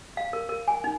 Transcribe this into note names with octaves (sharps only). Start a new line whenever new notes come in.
F5
A#4
A#4
G#5
D#4